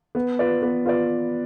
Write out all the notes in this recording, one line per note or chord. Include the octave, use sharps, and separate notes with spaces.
B3
F4 B4 D5
B3
F4 B4 D5